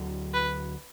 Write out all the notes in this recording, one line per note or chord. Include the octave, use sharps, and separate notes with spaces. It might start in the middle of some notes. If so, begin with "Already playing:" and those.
Already playing: D2 D3 F#3
B4